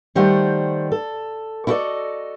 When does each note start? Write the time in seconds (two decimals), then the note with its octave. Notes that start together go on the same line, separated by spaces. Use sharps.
0.15 D#3 G3 A3 C5 F#5
0.92 A4
1.67 E4 F#4 A4 B4 D5 D#5